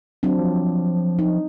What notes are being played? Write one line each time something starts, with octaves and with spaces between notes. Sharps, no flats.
F#3 C4 D4
F3
D#4